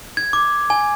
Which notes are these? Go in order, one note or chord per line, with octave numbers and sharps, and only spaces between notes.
G#6
D6
G#5